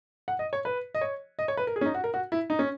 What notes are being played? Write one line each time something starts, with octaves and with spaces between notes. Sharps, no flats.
F#5
D#5
C#5
B4
D#5
C#5
D#5
C#5
B4
A#4
G#4
C#4
D#4
F#4
A#4
F#4
E4
D#4
C#4